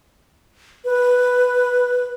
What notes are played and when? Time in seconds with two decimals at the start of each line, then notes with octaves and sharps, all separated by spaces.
0.85 B4